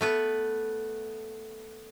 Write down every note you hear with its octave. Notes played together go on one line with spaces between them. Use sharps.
A3 B3 B4